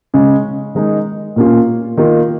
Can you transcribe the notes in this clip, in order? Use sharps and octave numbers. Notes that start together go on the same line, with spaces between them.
C#3 G#3 C#4
D#3 G#3 D#4
A#2 A#3 C#4 F4
D#3 A#3 F4